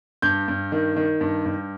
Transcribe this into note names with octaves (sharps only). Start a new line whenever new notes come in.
G2 G6
G2
D#3
D#3
G2
G2